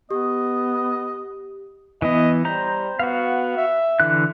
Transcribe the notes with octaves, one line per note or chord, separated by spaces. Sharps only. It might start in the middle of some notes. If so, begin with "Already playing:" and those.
B3 G4 D#5
E3 B3 D#5
G3 C5 A#5
B3 F#4 F5
E5
D3 E3 F#6